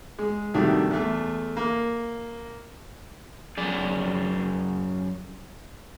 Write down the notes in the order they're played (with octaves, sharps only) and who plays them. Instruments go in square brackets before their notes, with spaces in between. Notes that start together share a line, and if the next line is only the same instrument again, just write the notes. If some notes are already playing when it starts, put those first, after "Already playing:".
[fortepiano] G#3
C2 D#3 G3 A3 D4 F#4
E2 A3
A#3
[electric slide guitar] F#2 G#4 D5